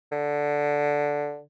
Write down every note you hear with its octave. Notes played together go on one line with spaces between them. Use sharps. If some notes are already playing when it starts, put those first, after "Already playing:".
D3